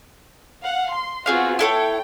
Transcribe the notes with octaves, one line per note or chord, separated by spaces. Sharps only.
F5 F#5
C6
B3 C4 F4 F#4 G#4 F5
E4 A4 C#5 G5